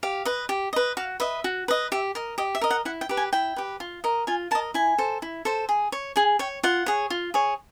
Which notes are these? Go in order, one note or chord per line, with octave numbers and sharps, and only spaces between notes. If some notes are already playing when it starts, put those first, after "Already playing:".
G4 F5
B4 D#5
G4
B4 D#5
F#4 F5
B4 D#5 E5
F#4
B4 D#5
G4 E5
A#4 D#5
G4 D#5
E5
A#4 D#5
F#5
E4 F#5
G5
G4 B4
G#5
E4 G5
G4 B4
F4
A#4 D#5
F4 G#5
A#4 D#5 A5
E4 G#5
A4 C5
E4
A4 C5
G#4
C#5
G#4 G#5
C#5 G5
F4 F#5
G#4 C#5
F4
G#4 C#5